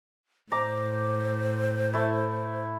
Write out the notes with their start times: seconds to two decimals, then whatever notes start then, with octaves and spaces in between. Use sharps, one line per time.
0.52 A2 C5 A#5 D6
1.93 A3 E4